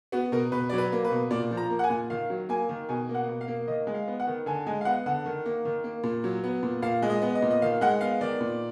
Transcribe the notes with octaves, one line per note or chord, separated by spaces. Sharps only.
B3 F#4
B2 A#4
B2 B4
F#3 D5
B4
A#3
B4
B2
A#2 D5
F3
A#5
A#3
F#5
G#5
A#2
D#3 F5
F#3
A#3 G#5
D#3
B2 G#5
A#3
F#5
B2
F5
A#3
D#3 D#5
G#3
F5
B3
F#5
D#3
D3 G#5
G#3 G#5
F5
B3 F#5
D3 F#5
D#3
A#3
D#3
A#3
A#2
F#3
B3
A#2
A#2 F5
G#3
D#5
B3
D#5
A#2
D#5
D#3 F5
G#3 F#5
B3 F5
D#3 D5
A#2